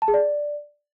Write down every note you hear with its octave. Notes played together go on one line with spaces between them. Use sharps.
A5
G#4
D5